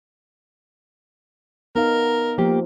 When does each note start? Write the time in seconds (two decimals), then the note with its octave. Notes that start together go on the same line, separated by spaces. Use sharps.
1.76 B3 D#4 A#4 F5
2.38 F3 A#3 G4